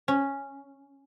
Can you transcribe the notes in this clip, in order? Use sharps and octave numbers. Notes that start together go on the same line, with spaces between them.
C#4